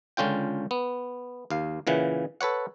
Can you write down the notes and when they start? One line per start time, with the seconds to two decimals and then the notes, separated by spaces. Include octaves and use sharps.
0.17 C#2 D3 C#4 F4 G5
0.71 B3
1.50 D#2 F5
1.87 A#2 C#3 E3 F#5
2.41 A4 B4 C#5 F#5